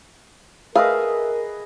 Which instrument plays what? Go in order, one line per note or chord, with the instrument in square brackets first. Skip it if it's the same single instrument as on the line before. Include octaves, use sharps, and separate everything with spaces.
[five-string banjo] A3 F5 [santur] G#4 B4 D#5 [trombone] A#4